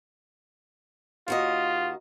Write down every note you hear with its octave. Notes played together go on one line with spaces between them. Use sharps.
D#2 F4 F#4 D#5